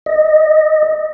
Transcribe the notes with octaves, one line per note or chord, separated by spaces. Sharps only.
D#5